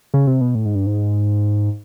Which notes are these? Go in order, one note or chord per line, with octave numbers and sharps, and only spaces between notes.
C#3
C3
B2
A2
G#2
G2
G#2